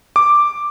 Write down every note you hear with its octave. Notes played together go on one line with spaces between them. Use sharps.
D6